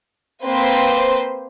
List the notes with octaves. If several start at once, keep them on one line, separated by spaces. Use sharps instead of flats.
A#3 C4 B4 C5